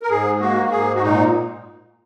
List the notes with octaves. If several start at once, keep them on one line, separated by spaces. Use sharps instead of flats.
A#4
G#2 G#4
A#3 F#4
G#2 G#4
F#4
A#2 D#4